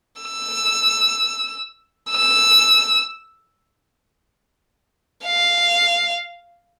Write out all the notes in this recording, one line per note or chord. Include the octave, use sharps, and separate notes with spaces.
E6
E6
F5